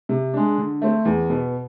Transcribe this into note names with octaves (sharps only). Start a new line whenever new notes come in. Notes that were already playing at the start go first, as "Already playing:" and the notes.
C3
G#3 D4
D3
A3 C4
E2
B2 B3